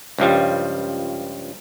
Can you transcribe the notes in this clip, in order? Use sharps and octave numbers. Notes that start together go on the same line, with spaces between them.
C#2 G2 F3 G3